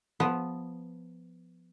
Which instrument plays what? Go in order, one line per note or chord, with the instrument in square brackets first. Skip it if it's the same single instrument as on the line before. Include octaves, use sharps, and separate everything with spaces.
[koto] F3 B3